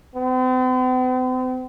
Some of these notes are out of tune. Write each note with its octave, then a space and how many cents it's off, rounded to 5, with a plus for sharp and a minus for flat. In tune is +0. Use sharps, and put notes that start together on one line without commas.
C4 -45